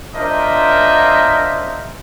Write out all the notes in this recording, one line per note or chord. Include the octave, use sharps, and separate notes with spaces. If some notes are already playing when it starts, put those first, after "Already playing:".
D4 F4 A#4 C5 D#5 E5